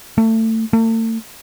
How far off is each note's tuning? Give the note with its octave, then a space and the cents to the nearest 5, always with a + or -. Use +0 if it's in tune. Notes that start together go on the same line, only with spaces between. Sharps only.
A3 +25
A3 +40